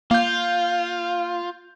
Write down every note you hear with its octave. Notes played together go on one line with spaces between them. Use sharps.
A#3 F4 F5 G6